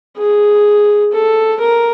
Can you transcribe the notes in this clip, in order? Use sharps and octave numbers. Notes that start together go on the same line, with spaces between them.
G#4
A4
A#4